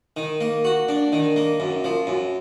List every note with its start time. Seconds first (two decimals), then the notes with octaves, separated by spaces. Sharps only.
0.17 D#3
0.41 A#3
0.65 F#4
0.89 D4
1.12 D#3
1.36 A#3
1.60 F#2
1.84 F3
2.07 F#2